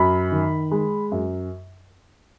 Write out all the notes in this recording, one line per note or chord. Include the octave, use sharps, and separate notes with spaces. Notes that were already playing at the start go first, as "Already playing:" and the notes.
Already playing: F#2 B5
D#3
G#3
F#2